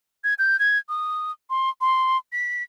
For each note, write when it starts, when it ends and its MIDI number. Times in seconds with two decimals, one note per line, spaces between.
0.24 0.34 92
0.39 0.59 91
0.59 0.78 92
0.89 1.31 87
1.50 1.69 84
1.81 2.18 84
2.32 2.63 95